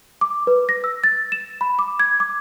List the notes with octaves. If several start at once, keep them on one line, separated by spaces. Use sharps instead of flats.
D6
B4
A#6
E6
A6
E7
B5
D6
G#6
D6